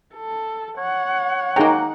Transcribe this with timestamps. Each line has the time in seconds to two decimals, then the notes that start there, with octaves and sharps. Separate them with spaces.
0.14 A4
0.78 C#5 F#5
1.56 F#3 A#3 D#4 G#4 G5